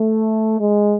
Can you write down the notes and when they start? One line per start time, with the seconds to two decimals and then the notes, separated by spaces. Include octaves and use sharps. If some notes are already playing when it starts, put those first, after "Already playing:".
Already playing: A3
0.59 G#3